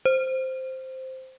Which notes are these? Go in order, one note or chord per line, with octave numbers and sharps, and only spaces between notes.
C5